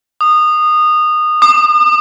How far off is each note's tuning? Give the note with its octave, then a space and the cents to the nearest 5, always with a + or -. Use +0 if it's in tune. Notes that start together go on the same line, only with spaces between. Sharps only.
D#6 -20
D#6 -45